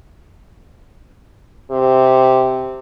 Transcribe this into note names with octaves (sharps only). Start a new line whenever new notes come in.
C3